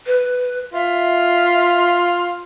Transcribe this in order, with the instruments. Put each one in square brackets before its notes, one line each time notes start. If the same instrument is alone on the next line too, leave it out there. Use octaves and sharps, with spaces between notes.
[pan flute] B4
[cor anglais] F4 [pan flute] E5